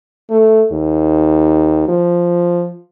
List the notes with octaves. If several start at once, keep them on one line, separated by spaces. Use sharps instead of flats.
A3
D#2
F3